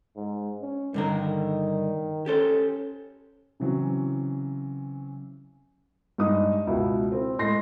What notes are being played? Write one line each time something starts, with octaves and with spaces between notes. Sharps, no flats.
G#2
C#4
G2 D3 D#3 A#4
C#4 G4 A4 C5
C#3 E3 F#3 C4 C#4
G2 G#3 D#4 D#6
C#2 B2 E4
C4
A2 G#3 C6 A#6 C7